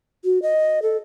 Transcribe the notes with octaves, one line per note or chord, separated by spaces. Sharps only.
F#4
D#5
A4